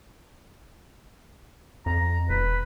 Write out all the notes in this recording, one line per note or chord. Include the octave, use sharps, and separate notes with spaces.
F2 A#5
E1 B4